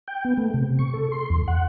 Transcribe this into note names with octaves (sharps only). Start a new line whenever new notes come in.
G5
B3
A3
C3
C#6
A4
C6
E2
F#5